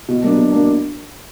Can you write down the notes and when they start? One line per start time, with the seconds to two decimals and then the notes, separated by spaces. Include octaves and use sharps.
0.08 B2
0.23 F#3 A#3 D4
0.37 B2
0.52 F#3 A#3 D4